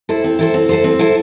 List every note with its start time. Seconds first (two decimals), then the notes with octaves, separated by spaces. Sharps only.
0.09 E4 A4 C5
0.24 C4
0.39 E4 A4 C5
0.54 C4
0.69 E4 A4 C5
0.84 C4
0.99 E4 A4 C5